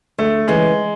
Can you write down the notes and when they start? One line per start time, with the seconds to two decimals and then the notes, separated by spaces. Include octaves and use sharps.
0.18 D2 A3
0.48 C#3 E3 G#3